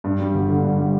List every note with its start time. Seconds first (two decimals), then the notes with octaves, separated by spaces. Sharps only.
0.04 G2
0.20 G3
0.34 G1
0.49 D3
0.64 G2
0.79 G3